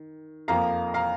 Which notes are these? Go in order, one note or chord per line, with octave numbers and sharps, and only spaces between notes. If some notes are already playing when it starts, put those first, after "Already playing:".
Already playing: D#3
F2 F3 A#3 F5 A#5
F5 A#5